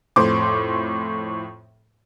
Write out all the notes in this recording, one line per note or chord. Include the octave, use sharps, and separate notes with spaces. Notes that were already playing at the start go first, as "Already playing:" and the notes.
F2 A2 C5 C6 D6